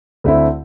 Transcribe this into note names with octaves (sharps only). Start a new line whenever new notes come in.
D2 D3 A3 C4 E4